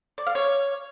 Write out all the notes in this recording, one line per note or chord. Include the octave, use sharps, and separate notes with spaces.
D5
F5
C#5